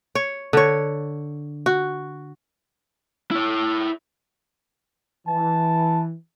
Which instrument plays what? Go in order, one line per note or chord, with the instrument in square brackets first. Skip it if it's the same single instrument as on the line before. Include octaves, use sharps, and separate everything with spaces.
[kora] C#5
D3 C#5
F#4
[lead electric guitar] E4 C#5
[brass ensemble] E3 [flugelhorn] A5